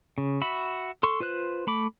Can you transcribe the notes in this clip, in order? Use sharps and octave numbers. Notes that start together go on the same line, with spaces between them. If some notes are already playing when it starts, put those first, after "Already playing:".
C#3
F#4 E5 B5
A4 C6 C#6
F4 B4 C5 F#6
A3 B5 D6